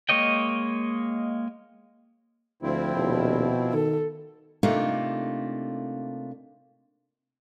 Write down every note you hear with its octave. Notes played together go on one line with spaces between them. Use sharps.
G#3 A#3 C#5 D#5 G5
D2 F3 C4 E4
D#1 B2
D#3 A4
C3 A3 A#3 D4 D#4 F4